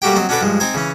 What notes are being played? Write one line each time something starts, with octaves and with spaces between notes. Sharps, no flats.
G3 A3 A#3 F#4 G4 G5
F#3 C4 D#5
C#4 D4 F#4 A4 B4 D5
G2 F3 G#3
C4 D#4 C5 G#5
C#3 E3 C#4